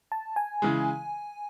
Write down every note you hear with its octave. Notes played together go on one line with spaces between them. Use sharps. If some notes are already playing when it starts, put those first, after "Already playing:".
A5
G#5
C#3 E3 G#3